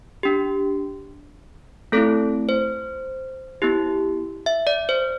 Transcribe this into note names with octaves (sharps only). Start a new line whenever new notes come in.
D4 G4
A3 C4 E4 A4
C5
B3 E4 G4
E5
D5
C5